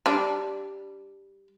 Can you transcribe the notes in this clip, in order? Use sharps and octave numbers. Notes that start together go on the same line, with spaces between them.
G3 D4